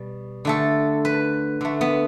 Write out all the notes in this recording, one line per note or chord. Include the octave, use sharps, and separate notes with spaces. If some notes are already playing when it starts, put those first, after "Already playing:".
Already playing: B2 G3
D3 A3 A4
B4
D3 A3
B3